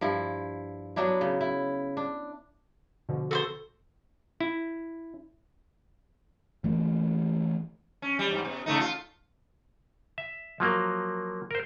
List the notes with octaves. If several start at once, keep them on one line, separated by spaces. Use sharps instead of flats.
G2 F3 E4
F#3 B3 D4 E4
C#3
E4
D4
B2 D3 F3
F#4 A4 B4 C5
E4
E3 A3 A#3
C#4
G3
G#2 G3
B2
C#3 A3 D#4
F4
E5
F3 F#3 A#3
A#4 C5